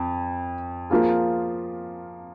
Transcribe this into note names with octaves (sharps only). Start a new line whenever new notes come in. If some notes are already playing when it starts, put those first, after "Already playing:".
Already playing: F2
F3 A#3 F4 G#4